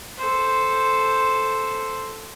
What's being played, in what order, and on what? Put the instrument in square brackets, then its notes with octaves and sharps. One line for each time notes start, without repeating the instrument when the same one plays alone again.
[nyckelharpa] A4 C5